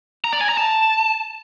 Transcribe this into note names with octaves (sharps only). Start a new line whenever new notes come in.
A#5
D5
G#5
A#5
A5